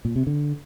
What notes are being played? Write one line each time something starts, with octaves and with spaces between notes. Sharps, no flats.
A#2
C3
D3